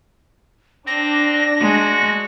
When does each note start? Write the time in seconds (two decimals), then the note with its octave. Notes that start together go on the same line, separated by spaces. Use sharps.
0.87 C4 D4 A#6
1.61 G#3 F#4